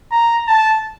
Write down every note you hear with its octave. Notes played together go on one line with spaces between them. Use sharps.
A#5
A5